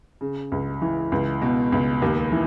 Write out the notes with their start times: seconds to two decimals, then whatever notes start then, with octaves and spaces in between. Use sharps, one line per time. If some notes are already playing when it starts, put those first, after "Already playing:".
0.21 C#3
0.52 C#2
0.82 E3
1.12 C#2
1.42 B2
1.72 C#2
2.02 D#2
2.32 E3